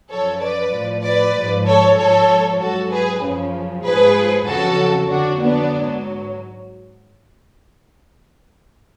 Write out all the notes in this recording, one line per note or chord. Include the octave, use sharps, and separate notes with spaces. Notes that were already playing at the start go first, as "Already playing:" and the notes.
F#2 F3 A4 C#5
B4 D5
A2 F3
B4 D5
G#2 F3
A4 C#5
G#2 F3 A4 C#5
G#2 F#3 F#4 A4
G#4 B4
F#2 C#3 F3
G#2 F3 G#4 B4
F2 C#3 F#3 F#4 A4
F2 D3 F#3 D4 F#4
B3 D4
G#2 F#3